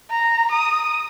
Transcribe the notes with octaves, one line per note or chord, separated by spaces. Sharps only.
A#5
D#6